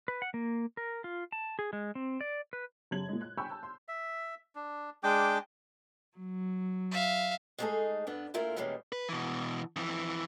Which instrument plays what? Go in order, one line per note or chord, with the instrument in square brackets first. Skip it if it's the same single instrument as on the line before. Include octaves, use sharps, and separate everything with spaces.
[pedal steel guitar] B4
F#5
A#3
A#4
F4
A5
G#4
G#3
C4
D5
B4
[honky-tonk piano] F#2 C#3 G4 A5 G#6 F#7
A#2 G#3
F#6
G5 G#5 B5 C#6 E6 G6
A5
C6
[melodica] E5
D4
G#3 D4 G5 D6
[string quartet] F#3
[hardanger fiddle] E5 F5
[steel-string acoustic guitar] G#3 A3 D#4 F#4 G#4 A4
G2 B3 D4
A#2 A3 E4 F4 A#4
B2 E3 G3 G#3 A#3 C#4
[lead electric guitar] B4
B2 E3
F2 E3